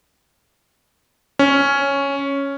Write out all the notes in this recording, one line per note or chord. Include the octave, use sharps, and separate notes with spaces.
C#4